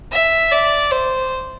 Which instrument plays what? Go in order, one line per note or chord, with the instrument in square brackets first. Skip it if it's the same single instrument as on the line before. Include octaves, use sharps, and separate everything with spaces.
[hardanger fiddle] E5
D5
C5